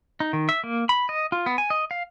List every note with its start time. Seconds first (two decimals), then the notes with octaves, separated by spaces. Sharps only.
0.20 D#4
0.33 D#3
0.49 E5
0.64 A#3
0.89 B5
1.09 D#5
1.32 F4
1.46 B3
1.58 G#5
1.70 D#5
1.91 F5